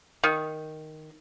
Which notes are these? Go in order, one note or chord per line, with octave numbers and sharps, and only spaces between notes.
D#3